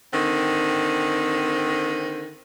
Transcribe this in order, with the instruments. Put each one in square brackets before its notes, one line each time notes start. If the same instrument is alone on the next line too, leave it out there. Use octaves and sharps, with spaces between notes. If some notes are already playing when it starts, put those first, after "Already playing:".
[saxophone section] D3 D#3 C4